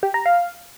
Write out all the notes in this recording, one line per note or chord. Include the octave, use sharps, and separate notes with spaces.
G4
A#5
F5